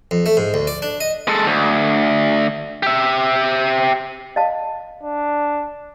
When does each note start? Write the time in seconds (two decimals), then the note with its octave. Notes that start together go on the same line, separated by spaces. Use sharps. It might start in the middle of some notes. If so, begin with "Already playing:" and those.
0.11 F2
0.26 A3
0.37 G#2
0.54 D2
0.67 D5
0.82 D4
1.01 D#5
1.28 G#3 A4
1.46 D2
2.83 G4 E5
4.36 D#5 F5 A5
5.03 D4